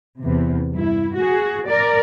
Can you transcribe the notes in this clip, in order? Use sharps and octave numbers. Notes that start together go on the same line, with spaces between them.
E2 C3
G2 E4
F#4 G#4
A#4 D5